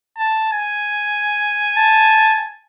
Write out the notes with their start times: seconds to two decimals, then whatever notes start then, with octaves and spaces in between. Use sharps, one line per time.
0.18 A5
0.52 G#5
1.77 A5